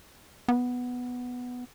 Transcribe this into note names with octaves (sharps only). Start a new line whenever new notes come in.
B3